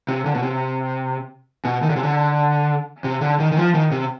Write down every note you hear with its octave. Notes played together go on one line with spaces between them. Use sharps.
C3
D3
B2
C3
B2
D#3
D3
C3
D3
C3
D3
D#3
D#3
F3
D#3
C3